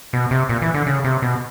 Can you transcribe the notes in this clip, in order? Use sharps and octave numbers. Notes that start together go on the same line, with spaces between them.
B2
C3
A#2
E3
D3
C#3
C3
B2